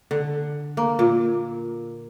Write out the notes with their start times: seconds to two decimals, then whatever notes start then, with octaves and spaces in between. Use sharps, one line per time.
0.11 D3
0.77 A#3
0.99 A#2